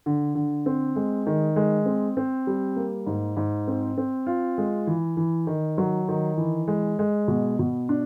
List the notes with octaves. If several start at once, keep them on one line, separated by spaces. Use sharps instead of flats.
D3
D3
C4
G#3
D#3
G#3
C4
C4
G3
A#3
G#2
G#2
C4
C4
F4
G#3
E3
E3
D#3
F#3
D#3
E3
G#3
G#3
B2
B2
D4